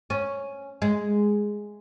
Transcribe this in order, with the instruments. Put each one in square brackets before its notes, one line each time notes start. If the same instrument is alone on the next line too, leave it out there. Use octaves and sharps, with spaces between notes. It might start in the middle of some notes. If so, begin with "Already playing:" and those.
[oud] C#4
G#3